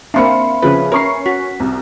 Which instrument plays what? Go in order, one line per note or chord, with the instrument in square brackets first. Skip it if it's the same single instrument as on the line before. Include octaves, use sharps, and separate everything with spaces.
[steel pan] A#3 C4 D4 [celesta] E5 B5 [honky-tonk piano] F5 C6 C#7
[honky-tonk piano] C#3 F3 C#4 [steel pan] B4
[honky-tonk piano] C#4 C#6 C7 [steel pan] A#4
[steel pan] F#4 [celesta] B6
[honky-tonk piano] C2